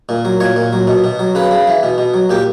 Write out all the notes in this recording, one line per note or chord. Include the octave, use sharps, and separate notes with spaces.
A#2
F#3
A#2 C#5
A#2
F#3
B2
B2
F#3
C#3 B4
C#3
E3
B2
B2
F#3
A#2 G4